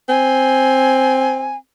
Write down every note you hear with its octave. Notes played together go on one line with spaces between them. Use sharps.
C4 G#5